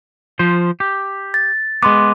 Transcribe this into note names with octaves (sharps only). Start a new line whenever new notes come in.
F3 C5
G4
A6
G#3 B3 C6 D6